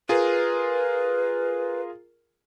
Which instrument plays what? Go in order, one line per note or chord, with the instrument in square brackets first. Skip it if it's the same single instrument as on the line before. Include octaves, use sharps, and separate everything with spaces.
[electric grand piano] F4 G#4 A#4 [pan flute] B4